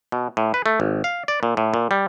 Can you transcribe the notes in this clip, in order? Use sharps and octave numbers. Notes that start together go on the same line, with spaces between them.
B2
A2
B4
A3
G#1
F5
D5
A#2
A2
A#2
G3